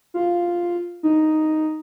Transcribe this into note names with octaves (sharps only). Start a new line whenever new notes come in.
F4
D#4